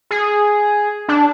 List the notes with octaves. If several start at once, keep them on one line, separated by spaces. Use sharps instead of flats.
G#4
D4